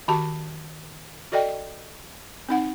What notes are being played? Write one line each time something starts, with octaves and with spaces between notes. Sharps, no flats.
D#3 F#4 G4 A5
F#4 A4 D5 D#5 G5
C4 D#4 F#5